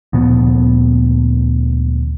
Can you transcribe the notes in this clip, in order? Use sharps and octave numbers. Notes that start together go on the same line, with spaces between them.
D2 A#2 F3 B3